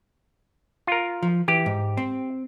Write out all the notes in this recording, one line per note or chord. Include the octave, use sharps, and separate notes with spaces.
F4 A#4
F3
E3 G4
G#2
C4